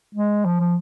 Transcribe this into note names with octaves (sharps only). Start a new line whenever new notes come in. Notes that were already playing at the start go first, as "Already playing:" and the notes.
G#3
F3
F3